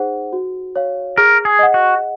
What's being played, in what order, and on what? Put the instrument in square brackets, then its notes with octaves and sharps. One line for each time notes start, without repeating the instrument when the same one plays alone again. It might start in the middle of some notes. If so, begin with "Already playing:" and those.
Already playing: [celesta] D#4 G#4 C5 F#5
F#4
C#5 F5
[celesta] G#4 [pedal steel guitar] A#4
[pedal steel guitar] G#4
[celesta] D#5 F#5
[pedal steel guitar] F#4